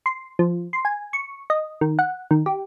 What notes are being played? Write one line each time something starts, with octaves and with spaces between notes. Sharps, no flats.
C6
F3
C6
G#5
C#6
D#5
D#3
F#5
D#3
G4